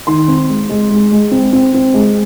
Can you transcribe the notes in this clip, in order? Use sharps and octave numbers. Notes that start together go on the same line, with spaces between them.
D#3 C6
C4
G#3
G#3
G#3
G#3
C4
C4
C4
G#3